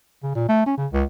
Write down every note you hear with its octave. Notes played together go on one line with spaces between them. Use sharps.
C#3
A#2
A3
C#4
C#3
C#2